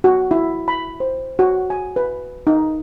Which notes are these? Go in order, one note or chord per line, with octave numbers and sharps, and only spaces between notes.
F#4
E4
B5
C5
F#4
G#5
B4
D#4